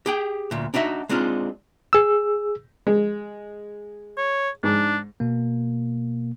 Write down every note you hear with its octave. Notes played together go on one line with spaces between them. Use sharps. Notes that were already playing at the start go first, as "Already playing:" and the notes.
G4 G#4 G5
D2 A#2
D4 D#4 F#4 E5
G#3 C4 D4 D#4 F4
G#4 E6
G#3
C#5
G#2 D4
B2 A#3